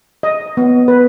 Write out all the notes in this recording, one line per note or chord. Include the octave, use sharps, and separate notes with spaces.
D#5
B3
B4